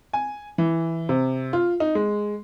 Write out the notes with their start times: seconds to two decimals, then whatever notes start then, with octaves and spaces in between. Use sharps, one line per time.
0.13 G#5
0.58 E3
1.09 C3
1.53 F4
1.80 D#4
1.95 G#3